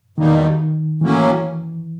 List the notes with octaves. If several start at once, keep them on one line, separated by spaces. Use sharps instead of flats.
E2 B2 D#3 G3 A#3 D#4
A2 E3 F#3 A#3 C#4